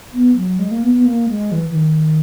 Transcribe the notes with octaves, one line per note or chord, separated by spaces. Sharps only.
B3
F#3
G#3
A#3
B3
B3
A#3
G#3
E3
E3
D#3